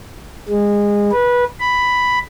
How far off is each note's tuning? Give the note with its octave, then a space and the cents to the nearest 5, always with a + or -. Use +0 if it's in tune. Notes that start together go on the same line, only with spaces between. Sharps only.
G#3 -20
B4 -20
B5 +5